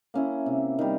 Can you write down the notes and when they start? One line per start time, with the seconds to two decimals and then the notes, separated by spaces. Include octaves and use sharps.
0.14 A#3 C#4 E4
0.46 C3
0.79 D#3 G3